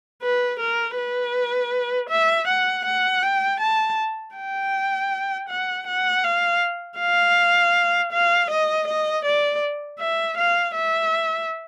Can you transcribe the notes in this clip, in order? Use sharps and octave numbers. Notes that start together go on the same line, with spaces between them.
B4
A#4
B4
E5
F#5
F#5
G5
A5
G5
F#5
F#5
F5
F5
F5
D#5
D#5
D5
E5
F5
E5